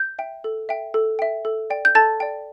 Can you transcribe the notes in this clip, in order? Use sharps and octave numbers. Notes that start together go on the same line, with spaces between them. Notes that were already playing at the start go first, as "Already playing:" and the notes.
Already playing: G6
E5 G5
A4
E5 G5
A4
E5 G5
A4
D5 G5
G6
A4 A5 A6
D5 G5